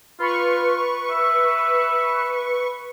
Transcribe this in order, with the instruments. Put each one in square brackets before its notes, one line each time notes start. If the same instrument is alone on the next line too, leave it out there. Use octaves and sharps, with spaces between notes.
[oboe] F4 [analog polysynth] B4 C#6
[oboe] E5